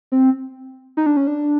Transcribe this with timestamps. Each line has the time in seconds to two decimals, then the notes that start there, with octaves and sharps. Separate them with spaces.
0.12 C4
0.97 D#4
1.06 D4
1.17 C#4
1.27 D4